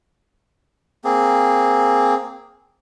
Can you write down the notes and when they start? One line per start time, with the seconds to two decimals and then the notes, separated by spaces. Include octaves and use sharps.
1.04 A#3 C4 G#4